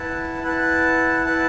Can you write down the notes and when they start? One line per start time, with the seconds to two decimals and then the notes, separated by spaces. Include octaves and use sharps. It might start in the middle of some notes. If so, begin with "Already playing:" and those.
Already playing: E4 B4 F#5 A5
0.43 E4 B4 F#5 A5
1.25 E4 B4 F#5 A5